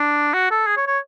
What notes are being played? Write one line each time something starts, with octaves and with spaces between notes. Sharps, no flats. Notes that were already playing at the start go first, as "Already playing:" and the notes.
Already playing: D4
F#4
A4
G#4
C#5
C#5